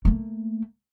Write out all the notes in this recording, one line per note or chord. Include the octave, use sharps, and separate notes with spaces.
A3 A#3